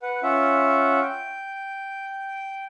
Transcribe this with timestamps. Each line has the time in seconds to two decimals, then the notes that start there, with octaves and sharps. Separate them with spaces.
0.02 B4 F#5
0.23 C#4 F4 E5 F#5
1.02 G5